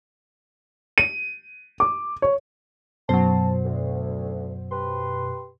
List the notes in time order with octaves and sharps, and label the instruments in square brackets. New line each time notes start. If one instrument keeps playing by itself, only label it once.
[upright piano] D#7
D6
C#5
[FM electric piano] F#2 B2 [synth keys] F#3 C5 [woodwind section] A5
[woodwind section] D2
G4 B4 C6